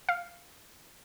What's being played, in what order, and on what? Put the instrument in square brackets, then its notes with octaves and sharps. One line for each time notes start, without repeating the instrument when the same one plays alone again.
[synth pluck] F5